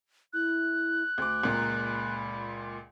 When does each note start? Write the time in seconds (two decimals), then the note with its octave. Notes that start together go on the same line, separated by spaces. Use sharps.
0.33 E4 F#6
1.18 D2 D6
1.43 C#2 A#2 A#5
1.79 B5